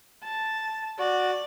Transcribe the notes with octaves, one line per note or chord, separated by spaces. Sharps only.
A5
F#4 D5